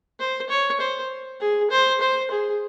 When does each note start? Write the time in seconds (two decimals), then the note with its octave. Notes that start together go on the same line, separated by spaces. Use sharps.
0.20 C5
0.49 C#5
0.80 C5
1.40 G#4
1.71 C5
2.00 C5
2.31 G#4